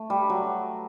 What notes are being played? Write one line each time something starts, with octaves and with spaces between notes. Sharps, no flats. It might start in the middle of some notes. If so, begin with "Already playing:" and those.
Already playing: A3
G3
F#3